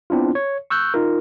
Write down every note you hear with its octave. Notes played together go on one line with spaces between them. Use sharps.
B3 C4 D4 E4 F4
C#5
C#6 E6 F#6 G6
D#4 F4 A#4